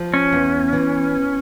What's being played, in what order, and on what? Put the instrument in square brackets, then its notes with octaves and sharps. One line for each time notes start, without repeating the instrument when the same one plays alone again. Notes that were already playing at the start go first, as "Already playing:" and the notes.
Already playing: [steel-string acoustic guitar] F3
[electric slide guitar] C#4
[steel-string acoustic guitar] E2
E3